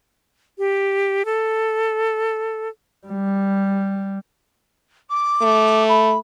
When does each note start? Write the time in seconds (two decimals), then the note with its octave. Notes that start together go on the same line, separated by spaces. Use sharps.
0.58 G4
1.25 A4
3.07 G3
5.09 D6
5.42 A3
5.89 B5